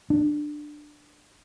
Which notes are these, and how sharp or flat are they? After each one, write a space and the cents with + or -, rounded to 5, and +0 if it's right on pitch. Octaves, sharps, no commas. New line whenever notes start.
D4 +15